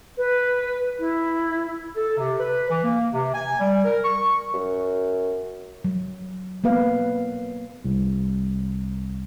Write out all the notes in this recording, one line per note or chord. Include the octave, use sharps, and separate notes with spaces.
B4
E4
A4
C3
B4
E3
A#3
C3
G#5
G3
A#4
C#6
F#2
F#3
A#3 B3 B4 F5
C2